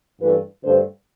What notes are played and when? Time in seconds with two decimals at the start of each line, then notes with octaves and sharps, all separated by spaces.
0.21 G2 E3 A3 D4 B4
0.63 G2 D3 A3 D4 C5